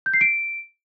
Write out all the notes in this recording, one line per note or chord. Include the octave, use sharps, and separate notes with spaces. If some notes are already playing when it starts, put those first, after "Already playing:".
G6
C7
D7